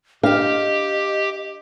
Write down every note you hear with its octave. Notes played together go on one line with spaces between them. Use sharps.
D4 G4 D#5 F5 G5